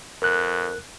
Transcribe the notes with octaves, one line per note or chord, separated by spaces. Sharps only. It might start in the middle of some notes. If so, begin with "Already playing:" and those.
F2 A#4 F#6